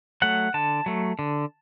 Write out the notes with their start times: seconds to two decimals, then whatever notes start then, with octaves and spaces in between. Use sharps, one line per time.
0.22 F#3 A3 F#5
0.54 D3 A5
0.86 F#3 A3
1.19 D3